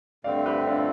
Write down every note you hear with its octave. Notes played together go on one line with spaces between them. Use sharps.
G2 D3 A3 C4 D5 F5
G4 B4
D4 F4